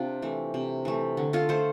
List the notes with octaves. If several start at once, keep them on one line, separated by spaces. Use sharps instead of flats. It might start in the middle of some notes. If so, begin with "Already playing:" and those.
Already playing: C3 C4 D4 F4
E3 A3
C3
E3 A3
D3
F4 A4
A3 A4 C5